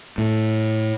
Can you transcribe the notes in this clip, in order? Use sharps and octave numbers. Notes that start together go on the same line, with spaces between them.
A2